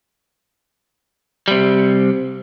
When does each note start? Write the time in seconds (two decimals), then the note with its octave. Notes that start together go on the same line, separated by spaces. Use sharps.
1.48 C3 G3